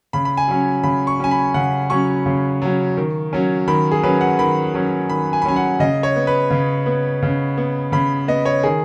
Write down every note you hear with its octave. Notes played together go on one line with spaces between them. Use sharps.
C#3 B5
B5
G#5
F#3 C#4
C#3 B5
C#6
F#3 C#4 G#5
B5
C#3 F#5
F#3 C#4 C#6
C#3
F#3 C#4
D#3
F#3 C#4
D#3 B5
G#4
F#3 C#4 B4
F#5
D#3 B5
F#3 C#4
D#3 B5
G#5
B5
F#3 C#4 G#5
F#5
C#3 D#5
C#5
B3
B4
C#3
B3
C#3
B3
C#3 B5
B3 D#5
C#5
D#3 G#4